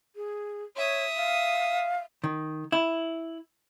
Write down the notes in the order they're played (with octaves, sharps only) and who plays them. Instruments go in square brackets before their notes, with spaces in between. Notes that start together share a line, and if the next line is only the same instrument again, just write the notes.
[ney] G#4
[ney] C#5 [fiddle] E5 D#6
[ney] F5
[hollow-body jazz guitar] D#3
E4